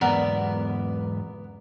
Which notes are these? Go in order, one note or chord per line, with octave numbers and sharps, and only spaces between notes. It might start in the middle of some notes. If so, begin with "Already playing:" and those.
E2 G#2 B3 A#4 D5